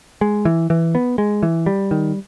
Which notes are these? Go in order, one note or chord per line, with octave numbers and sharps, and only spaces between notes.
G#3
E3
E3
B3
G#3
E3
G3
D#3